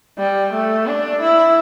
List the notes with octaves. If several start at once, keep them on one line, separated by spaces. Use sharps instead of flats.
G3
A3
D4
E4